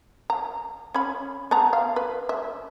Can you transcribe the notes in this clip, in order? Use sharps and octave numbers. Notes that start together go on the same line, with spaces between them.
A#5
C#4 B5
B3 A5 A#5
F5
B4
E5